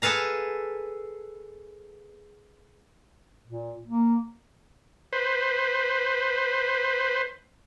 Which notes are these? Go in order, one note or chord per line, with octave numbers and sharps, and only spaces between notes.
G#4 A4 B4 F5 A#5
A#2
A#3
B4 C5